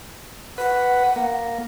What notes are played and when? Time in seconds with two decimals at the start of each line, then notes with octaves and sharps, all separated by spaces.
0.58 B4 F#5
1.16 A#3